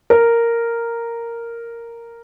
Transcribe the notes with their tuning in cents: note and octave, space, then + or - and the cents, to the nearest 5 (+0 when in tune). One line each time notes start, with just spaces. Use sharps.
A#4 -5